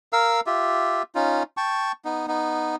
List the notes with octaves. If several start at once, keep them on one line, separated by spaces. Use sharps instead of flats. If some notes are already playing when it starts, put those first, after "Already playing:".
A#4 F5 E6
F4 G4 E5
C#4 D#4 F4
G5 A5 C#6
B3 D#4
B3 D#4